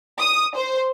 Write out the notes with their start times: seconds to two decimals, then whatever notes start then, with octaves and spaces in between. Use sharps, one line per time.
0.20 D#6
0.56 C5